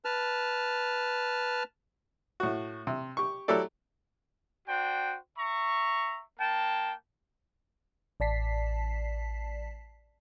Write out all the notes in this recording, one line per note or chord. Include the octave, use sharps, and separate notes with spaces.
B4 A5 F6
A2 F#4
C3
G4 C#6
F#3 A3 E4 G4 A4 D5
D4 F#4 C5 G5
E5 A#5 C#6
A#3 G5 A5
A1 D5 A5 B6 C7